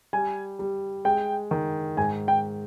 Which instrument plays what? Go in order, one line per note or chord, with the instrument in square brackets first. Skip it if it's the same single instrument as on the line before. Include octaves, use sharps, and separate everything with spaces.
[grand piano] G3 [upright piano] G#5
[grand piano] G3
[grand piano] G#3 [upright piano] G5
[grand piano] D#3
[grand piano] G#2 [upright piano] G#5
[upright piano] G5